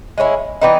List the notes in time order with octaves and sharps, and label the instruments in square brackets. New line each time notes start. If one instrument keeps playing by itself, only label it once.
[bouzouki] G#3 C#4 E4
E3 G3 B3 D#4